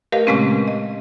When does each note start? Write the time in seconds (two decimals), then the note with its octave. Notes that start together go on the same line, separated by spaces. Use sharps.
0.12 A3 G4 A#4 B4 D#5 F5
0.27 A#2 C#3 G#3 A3 C4 C#4
0.68 D#5